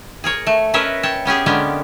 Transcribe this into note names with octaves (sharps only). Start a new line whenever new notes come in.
G#4 A#4 C#5
A3
C#4 A#4 B4 C#5 D#5 E5
C#5 G5 A5
B3 C#4 G4 G#4
D3 G#3 A#3 B3 C#4 G4